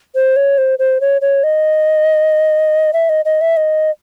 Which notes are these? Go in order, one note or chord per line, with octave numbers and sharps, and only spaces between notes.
C5
C#5
C5
C5
C#5
C#5
D#5
E5
D#5
D#5
E5
D#5